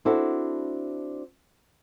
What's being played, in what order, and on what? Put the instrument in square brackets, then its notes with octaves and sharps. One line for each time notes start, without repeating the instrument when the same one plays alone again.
[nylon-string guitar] C4 D4 E4 F#4 A4